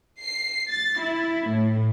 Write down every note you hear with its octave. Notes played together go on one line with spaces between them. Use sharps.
C7
A6
E4
A2